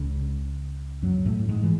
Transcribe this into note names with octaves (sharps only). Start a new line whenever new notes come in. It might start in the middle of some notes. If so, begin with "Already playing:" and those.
Already playing: C#2 C#3
F#2 F#3
A2 A3
G#2 G#3
E3